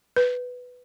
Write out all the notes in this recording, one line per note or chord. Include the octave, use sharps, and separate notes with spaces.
B4